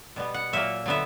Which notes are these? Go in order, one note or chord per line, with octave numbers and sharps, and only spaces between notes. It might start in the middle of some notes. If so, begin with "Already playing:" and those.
B2 G3 B3
F#5
A#2 F#3 A#3 E5
D3 F#3 B3 E5